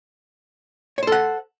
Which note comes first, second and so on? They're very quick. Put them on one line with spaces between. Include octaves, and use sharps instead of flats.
C#5 C5 A4 F#5